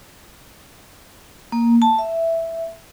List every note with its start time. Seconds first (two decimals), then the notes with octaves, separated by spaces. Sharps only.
1.52 A#3
1.82 A5
1.99 E5